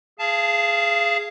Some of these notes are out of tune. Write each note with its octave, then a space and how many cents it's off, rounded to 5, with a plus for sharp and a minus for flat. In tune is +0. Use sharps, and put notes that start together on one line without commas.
G#4 +5 F5 -30 A5 -10